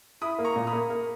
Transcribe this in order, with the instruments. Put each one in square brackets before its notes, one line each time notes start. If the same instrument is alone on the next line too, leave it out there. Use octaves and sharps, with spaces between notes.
[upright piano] E4 [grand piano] B5 D#6
[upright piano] A#3
[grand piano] A#5 C#6
[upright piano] A#2
[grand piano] B5 D#6
[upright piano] A#3
A#3